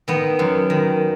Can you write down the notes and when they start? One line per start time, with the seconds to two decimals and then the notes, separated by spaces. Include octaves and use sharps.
0.08 D#3 B3
0.39 F#2
0.70 D#3